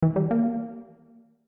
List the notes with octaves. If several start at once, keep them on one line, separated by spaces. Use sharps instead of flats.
E3
G3
A#3